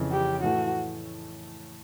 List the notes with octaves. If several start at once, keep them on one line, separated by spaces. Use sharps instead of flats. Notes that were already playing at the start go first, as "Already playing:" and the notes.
Already playing: F2 C#3 E3
G4
A2 E3 A3 F#4